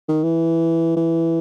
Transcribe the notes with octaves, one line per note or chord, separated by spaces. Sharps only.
D#3
E3
E3